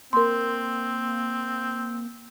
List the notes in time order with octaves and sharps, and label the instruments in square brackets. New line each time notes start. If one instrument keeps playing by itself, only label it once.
[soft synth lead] A#3 [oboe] C4 [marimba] A#4 C6